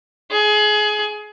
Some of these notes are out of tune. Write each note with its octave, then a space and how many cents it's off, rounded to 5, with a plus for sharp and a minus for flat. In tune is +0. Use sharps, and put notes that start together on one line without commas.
G#4 +25